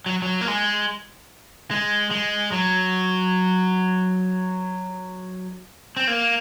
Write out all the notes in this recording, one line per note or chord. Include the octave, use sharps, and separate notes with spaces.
F#3
F#3
A#3
G#3
G#3
G#3
F#3
C4
A#3